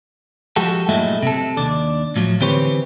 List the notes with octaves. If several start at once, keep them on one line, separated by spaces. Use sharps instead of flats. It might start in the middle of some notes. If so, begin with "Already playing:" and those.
F3 G#3 F#4 G4 A4
G2 A#2 F#3 G#3 A3 E4
C3 A4
D#2 D4 D5
A2 F3 F#3
D3 E3 C4 G4 B4 C#5